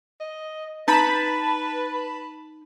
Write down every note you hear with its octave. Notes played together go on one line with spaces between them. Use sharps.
D#5
D#4 B4 A5 B5